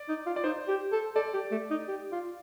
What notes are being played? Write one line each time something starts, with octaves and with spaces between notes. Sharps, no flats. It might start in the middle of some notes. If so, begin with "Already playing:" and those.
Already playing: D5
D#4
F4
D5
D#4 C5
G4
A4
A4 D5
G4
A3
D#4
G4
F4